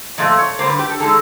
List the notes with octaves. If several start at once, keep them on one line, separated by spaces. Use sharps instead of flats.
A#2 F3 A3 D#5
C#5
D3 G3 A#3 C5
B4
G4
A4
D#3 G#3 A4